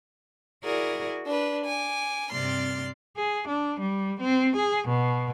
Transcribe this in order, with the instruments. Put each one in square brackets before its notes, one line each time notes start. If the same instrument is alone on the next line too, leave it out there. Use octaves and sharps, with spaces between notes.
[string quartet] E4 F#4 G#4 A#4 D5
D4 B4
G#5 D6
G2 C3 C4 D5 C6 F6
G#4
D4
G3
C4
G#4
B2